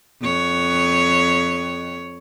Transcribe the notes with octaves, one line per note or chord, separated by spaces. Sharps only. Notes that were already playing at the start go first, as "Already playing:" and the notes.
F2 C#5